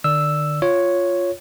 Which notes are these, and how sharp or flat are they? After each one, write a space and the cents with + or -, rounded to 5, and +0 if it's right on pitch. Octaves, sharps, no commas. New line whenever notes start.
D3 +40 D5 +0 E6 +0
F4 +0 C#5 +0